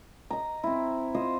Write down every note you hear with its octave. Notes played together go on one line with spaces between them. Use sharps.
D#5 A#5
C4 E4
F4 C5 D#5